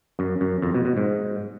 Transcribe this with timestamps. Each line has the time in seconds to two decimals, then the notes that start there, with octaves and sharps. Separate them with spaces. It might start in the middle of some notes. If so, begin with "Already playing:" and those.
0.19 F#2
0.41 F#2
0.62 F2
0.74 B2
0.85 B2
0.97 G#2